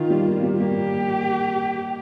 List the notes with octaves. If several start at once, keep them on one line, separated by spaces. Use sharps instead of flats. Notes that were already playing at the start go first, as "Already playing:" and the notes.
Already playing: D#3 F4
G3
A#3
G3
A#3 G4